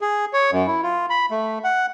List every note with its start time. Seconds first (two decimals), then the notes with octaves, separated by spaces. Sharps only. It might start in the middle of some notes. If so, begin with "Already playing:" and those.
0.01 G#4
0.33 C#5
0.52 F#2
0.67 E4
0.83 F4
1.10 B5
1.31 A3
1.64 F#5